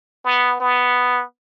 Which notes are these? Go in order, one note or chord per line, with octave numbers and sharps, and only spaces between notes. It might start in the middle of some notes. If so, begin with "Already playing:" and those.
B3
B3